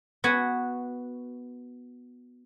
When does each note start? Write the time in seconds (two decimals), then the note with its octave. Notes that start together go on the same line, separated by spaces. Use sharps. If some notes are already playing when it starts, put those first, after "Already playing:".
0.24 B3 F#4 G#5